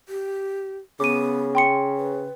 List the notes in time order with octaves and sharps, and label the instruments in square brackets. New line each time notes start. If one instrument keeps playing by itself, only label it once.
[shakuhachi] G4
[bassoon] C#3 [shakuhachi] B3 [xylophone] D6 D#7
[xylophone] G5 C6 C#7
[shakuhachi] B4